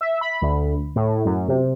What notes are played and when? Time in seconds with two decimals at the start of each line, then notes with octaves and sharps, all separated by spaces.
0.01 E5
0.21 B5
0.42 D2
0.96 A2
1.25 F#2
1.48 C3